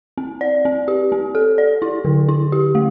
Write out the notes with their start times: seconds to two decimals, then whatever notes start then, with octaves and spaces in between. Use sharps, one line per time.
0.18 C4
0.41 D5
0.65 C4
0.88 G4
1.12 C4
1.35 A4
1.58 D5
1.82 E4
2.05 D3
2.29 E4
2.52 G4
2.75 A3